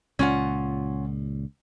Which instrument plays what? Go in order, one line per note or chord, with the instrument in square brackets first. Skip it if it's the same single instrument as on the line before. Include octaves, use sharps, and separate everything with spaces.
[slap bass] C#2 A#2 [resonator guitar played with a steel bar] C#4 F4 F#5